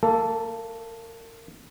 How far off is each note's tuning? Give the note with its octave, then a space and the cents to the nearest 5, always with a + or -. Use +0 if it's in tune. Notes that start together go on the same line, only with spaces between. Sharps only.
A#3 -30 A4 +5